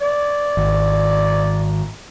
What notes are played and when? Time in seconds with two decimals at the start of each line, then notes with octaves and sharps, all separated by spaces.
0.01 D5
0.57 G#1